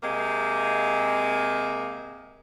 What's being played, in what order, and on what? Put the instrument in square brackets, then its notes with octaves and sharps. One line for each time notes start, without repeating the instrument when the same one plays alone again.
[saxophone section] C3 G#3 A#3